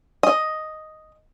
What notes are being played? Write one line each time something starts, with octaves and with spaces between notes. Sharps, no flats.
D#5